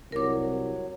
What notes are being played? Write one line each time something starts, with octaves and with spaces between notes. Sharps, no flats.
C2 F#3 A#4 D6